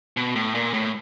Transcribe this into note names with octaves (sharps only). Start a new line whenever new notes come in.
B2
A2
A#2
A2